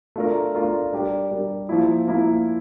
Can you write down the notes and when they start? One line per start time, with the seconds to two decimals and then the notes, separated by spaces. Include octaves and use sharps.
0.16 A3 D4 F4 A#4
0.55 A3 D4 F4 A#4
0.92 G3 D4 G4 A#4
1.30 G3 D4 G4 A#4
1.69 F3 A#3 E4
2.07 F3 A#3 E4